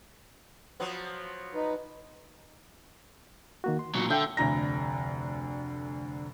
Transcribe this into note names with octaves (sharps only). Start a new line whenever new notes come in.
F3 F#3 B3
D#4 B4
D#3 A#3 F#4
C6
A#2 F#3
D3 E5 G5
F1 D2 D3 A#5 A#6